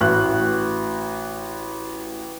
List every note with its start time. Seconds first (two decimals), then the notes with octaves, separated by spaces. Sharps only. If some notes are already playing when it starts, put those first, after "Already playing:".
0.01 A1 F#4 F#6